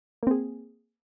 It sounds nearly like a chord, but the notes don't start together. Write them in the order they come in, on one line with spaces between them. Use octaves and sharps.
A#3 C4 G#4